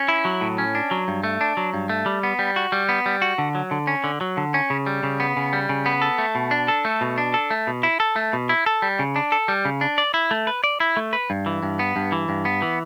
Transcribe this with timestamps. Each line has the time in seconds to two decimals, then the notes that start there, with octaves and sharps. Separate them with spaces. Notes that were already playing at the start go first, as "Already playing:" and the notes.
Already playing: C#4
0.08 E4
0.25 F#3
0.41 A2
0.58 C#4
0.75 D4
0.91 F#3
1.08 G2
1.24 A3
1.41 D4
1.57 F#3
1.74 G2
1.89 A3
2.06 G3
2.23 B3
2.39 G3
2.56 F#4
2.72 G3
2.89 B3
3.06 G3
3.22 F#4
3.38 D3
3.55 F#3
3.71 D3
3.87 C#4
4.04 D3
4.21 F#3
4.37 D3
4.54 C#4
4.70 C#3
4.86 G3
5.03 C#3
5.20 B3
5.37 C#3
5.53 G3
5.69 C#3
5.86 B3
6.02 A4
6.18 A3
6.35 B2
6.51 D4
6.68 A4
6.85 A3
7.01 B2
7.18 D4
7.34 A4
7.50 A3
7.67 B2
7.83 E4
8.00 A4
8.16 A3
8.33 B2
8.49 E4
8.66 A4
8.82 G3
8.99 C#3
9.16 D4
9.32 A4
9.48 G3
9.65 C#3
9.81 D4
9.98 D5
10.14 E4
10.31 A3
10.47 B4
10.64 D5
10.80 E4
10.97 A3
11.13 B4
11.30 G2
11.46 E3
11.63 G2
11.79 B3
11.96 G2
12.12 E3
12.29 G2
12.45 B3
12.62 E3